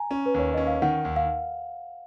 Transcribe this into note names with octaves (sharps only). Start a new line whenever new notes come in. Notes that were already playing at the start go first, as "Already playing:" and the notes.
Already playing: G#5 A#5
C#4
B4
D#2 C#5
C#4 D#5
F5
D#3 F#5
D#2
F5